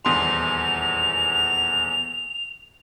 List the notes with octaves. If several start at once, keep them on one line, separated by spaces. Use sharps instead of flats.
D#1 E2 C6 F7